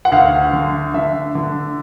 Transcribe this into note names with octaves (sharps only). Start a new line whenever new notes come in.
F#5
D2 F5
D3
D3 E5
D3